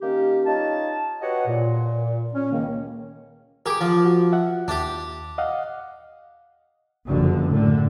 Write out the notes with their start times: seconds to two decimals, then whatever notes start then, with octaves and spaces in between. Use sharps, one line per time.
0.01 D#3 A#3 C#4 G4
0.46 D#4 F4 C#5 A5
1.21 F#4 G4 B4 C#5 D#5 F#5
1.47 A#2
2.34 C#4
2.51 C#2 D#3 A#3
3.66 G4 G#4 A#4 D6
3.81 F3
4.05 F#4
4.32 E5 F#5
4.68 D#2 D4 G4
5.38 D#5 F5 F#5
7.07 F#1 F2 D3
7.48 A2 D3